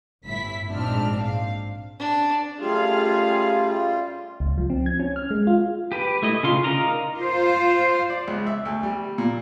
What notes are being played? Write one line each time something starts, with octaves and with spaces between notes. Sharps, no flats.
G1 A2 E4 B6
A#1 G#2 C4 D4 F6
F5
D4
F#2 G3 A3 F4 G4 G#4 F5
C#2
F3
C4
G#6
C#4
F6
G#3
F4
G4 B4
A3 E4 D#5
C#3 F4 C6
D#4 A#4 D5 F5 A#5
F4 C5
D5
C#2
E5
D2
G3
A#2